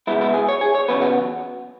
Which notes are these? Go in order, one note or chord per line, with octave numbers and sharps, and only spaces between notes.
C#2 B2 G#3 B3 E4
E4
G#4
C#5
G#4
C#5
E2 C#3 F#3 B3 B4
F#4